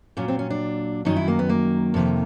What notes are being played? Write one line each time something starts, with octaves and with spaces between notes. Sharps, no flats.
A#2 F#3 C#4
C4
C#4
D4
F#2 D#3 F#3 D#4
E4
A#3
B3
A#3
F2 C3 D#3